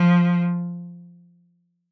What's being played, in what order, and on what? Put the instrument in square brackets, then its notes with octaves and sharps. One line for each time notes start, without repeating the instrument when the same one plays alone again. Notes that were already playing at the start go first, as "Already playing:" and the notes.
Already playing: [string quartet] F3